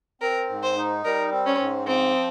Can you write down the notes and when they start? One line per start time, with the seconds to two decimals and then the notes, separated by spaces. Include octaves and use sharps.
0.21 C4 A#4
0.49 G#2
0.63 C5
0.77 D#4
1.04 G3 A#4
1.32 C4
1.46 C#4
1.60 G#2
1.87 F3 C4